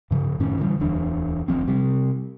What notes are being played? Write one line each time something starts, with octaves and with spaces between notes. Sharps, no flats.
G2 C#3 F3
F#2 A2 D#3 C#4
D3 E3 F3 G3
D1 E2 D4
F#1 C#2 F3 C4
C3 G3